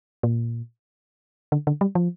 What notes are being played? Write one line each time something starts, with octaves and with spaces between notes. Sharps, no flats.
A#2
D3
D3
G3
F3